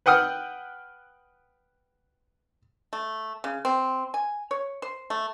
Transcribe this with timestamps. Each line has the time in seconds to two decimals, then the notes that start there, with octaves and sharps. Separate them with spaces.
0.06 B4 F#5 G5 D#6 F6
2.93 A3
3.44 C#3
3.65 C4
4.14 G#5
4.51 C#5
4.82 C5
5.10 A3